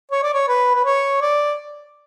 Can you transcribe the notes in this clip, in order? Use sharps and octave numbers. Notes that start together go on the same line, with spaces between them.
C#5
D5
C#5
B4
B4
C#5
D5